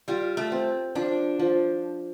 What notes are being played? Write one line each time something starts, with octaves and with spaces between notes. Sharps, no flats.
G3 F4
A3
C4
F3 D4
F3